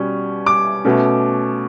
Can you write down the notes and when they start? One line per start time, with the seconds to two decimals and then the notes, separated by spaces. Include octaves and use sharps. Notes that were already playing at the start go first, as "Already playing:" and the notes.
Already playing: B2 G3 C#4
0.46 D6
0.85 B2 A3 C#4